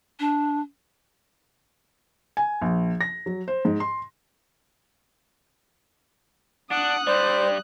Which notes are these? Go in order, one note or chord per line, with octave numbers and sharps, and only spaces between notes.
D4
G#5
A#1
A#6
F#3
C5
G#2
C6
D4 F#5 D#6 F#6
G2 G3 C5 D5